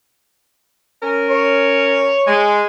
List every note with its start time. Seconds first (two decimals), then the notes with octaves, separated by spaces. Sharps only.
1.02 C#4 A#4
1.30 C#5
2.27 G#3